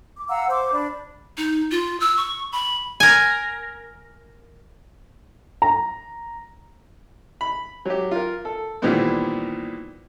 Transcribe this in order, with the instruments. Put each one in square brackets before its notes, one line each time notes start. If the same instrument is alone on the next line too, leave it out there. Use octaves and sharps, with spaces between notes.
[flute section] D6
F5 F#5 A#5 E6
C5 D6
D4 B5
[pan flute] D#4
F4
E6
C#6
B5
[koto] A#4 G#5
[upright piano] A#5
[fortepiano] B5
F#3 G4
F4 A#4
A4
A#2 D#3 E3 G3 B3 C4